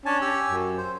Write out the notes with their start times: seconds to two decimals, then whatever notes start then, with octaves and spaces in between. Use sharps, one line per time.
0.06 C#4 D4 G#5 A5
0.22 G4 G#5 E6
0.51 F#2
0.78 C5